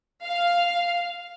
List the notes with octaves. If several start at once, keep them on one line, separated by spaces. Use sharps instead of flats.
F5